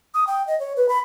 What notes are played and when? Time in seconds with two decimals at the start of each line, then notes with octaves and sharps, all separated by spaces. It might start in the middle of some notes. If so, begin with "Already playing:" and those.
0.14 D#6
0.27 G5
0.47 D#5
0.60 C#5
0.77 B4
0.89 B5